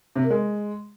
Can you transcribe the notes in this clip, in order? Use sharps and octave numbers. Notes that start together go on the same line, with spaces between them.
C3
A#3
G#3